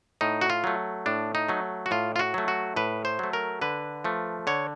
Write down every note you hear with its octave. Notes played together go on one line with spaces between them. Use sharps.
A2 D#4
F#4
F4
F#3 A3
A2 D4
D#4
F#3 A3
F#4
A2 F4
F4
F#4
F#3 A3
F#4
A2 B4
C5
F#3 A3
A#4
D3 B4
F3 A3
D3 C#5